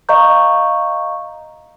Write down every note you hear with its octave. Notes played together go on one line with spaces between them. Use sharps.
D#5 F5 A#5 C#6 G6